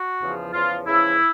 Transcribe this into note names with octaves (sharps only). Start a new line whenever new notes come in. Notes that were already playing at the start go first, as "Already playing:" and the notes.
Already playing: F#4
E2 C#3 F3
E2 C#3 F3 F4
E2 C#3 F3 E4